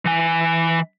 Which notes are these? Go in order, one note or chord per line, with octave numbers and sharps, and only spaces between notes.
E3 G#5